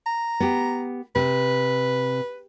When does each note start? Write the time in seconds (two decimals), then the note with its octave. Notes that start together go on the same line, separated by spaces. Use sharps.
0.07 A#5
0.40 B3 G4
1.15 C3 B4